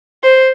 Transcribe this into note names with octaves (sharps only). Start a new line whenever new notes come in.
C5